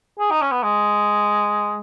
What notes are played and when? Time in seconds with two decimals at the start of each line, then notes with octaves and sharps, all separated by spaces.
0.19 G#4
0.31 D#4
0.42 C#4
0.52 B3
0.63 G#3